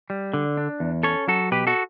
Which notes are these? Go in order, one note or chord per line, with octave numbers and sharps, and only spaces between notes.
G3
D3
D4
E2
C#4 A4 C#5
F#3 F#4 A4
B2 G4 B4
F#4 A4